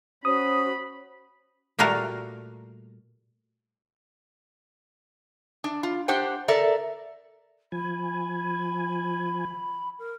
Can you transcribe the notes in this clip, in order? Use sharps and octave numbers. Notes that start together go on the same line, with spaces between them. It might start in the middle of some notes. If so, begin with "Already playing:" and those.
C#4 F#4 C5 B5 D#6
A#2 G3 A3 F#4 A#4 F5
D4
F4
D4 G4 C5 F#5 G5
A4 A#4 D5 E5
F3 G#5 B5
A#4